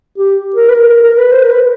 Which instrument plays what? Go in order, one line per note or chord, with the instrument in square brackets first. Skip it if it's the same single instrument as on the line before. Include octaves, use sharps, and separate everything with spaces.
[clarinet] G4
A#4
B4
A#4
A#4
A#4
B4
C5
A#4
B4